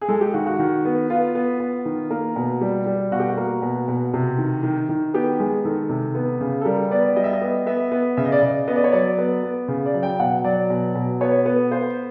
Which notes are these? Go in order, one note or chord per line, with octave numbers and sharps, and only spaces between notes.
G#4
G#3 A4
G4
D#3 F#4
F#4
D#3
B3
B3 F4
B3
B3
D#3
A#3
B2
G3
G3
B2 F#4
G4
F#4
A#3
B2
B2
C3
D#3
D#3
D#3
B3 G4
G#3 G#4
D#3 A4
C3
B3
C#3
A4
G3 A#4
B3 D5
G3 D#5
E5
D#5
B3
B3 E5
B3
C#3 E5
D#5
D5
C#3 D#5
B3 D#5
D5
C#5
F#3 D5
B3
B3
C#3
D5
F#3
G5
B2 F#5
F#3 D5
B2
B2
B3 C#5
B3
B3 C5